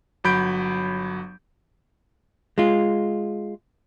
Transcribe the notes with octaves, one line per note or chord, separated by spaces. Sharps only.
G1 F#3 B5 G6 D7
G#3 F4